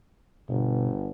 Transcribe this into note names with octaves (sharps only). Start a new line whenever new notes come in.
G1 B2